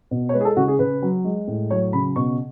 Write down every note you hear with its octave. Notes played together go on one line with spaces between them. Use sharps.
B2
C#5
G#3 B4
G#4
A4
C#3 F#4
G#4
C#3 B4
F#3
G#3
A2
F#3 C#5
C#3 B5
B2 C#6